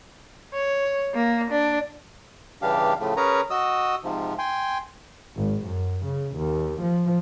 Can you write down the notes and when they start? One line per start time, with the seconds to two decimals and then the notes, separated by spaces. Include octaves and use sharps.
0.54 C#5
1.14 A#3
1.51 D4
2.62 G2 C#3 E3 D4 G4 F5
3.00 A2 C#3 F3 A3
3.17 C#4 G#4 A#4 B4 C#5 A#5
3.50 F#4 D#5 D#6 E6
4.04 G#2 C3 F3
4.39 G5 G#5 C6
5.36 G#1
5.65 F#2
6.05 C#3
6.36 D#2
6.82 F3